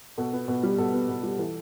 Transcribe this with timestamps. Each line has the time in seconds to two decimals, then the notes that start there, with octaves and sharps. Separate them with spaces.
0.18 B2 A4
0.33 B3
0.48 B2
0.63 G3
0.78 B2 A4
0.93 B3
1.09 B2
1.23 G3
1.39 E3 A4